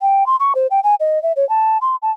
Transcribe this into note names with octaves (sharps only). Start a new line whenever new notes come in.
G5
C6
C#6
C5
G5
G#5
D#5
E5
C#5
A5
C6
A5